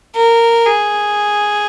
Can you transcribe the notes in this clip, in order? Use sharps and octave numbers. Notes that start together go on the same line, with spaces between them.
A#4
G#4